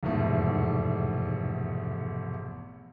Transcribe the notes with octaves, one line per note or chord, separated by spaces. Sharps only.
F1 E2 G#2 B2 A3